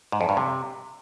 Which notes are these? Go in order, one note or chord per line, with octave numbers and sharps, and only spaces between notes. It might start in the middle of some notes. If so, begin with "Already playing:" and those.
G#2
F2
G2
C3